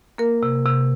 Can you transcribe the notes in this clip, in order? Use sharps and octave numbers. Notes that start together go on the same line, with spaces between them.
A#3 A#4
C3
C3